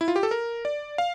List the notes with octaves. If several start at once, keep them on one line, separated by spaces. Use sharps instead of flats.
E4
F4
G4
A4
A#4
D5
F5